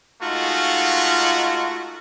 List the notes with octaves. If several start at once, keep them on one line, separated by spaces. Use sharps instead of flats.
G#3 A3 D#4 F4 F#4